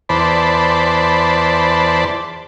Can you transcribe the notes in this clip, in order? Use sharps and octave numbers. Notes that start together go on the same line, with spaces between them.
E2 C5 D5 A5 B5